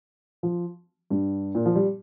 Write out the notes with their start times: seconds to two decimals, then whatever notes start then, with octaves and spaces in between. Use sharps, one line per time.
0.43 F3
1.10 G2
1.55 A#2
1.66 F3
1.76 G3